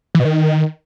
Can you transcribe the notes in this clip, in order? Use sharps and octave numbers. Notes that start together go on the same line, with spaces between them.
E3
B2
D#3